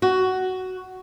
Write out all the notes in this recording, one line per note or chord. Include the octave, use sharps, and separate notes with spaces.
F#4